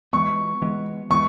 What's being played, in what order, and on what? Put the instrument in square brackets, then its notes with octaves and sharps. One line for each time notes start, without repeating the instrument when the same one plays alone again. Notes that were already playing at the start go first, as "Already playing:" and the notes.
[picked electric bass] E3 G#3 B3 [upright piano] C#6
[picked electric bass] E3 G#3 B3
[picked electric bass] E3 G#3 B3 [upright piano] C#6